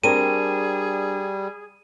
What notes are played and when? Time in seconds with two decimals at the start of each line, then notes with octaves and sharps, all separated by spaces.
0.04 G3 C4 D4 G#4 A#4 D#7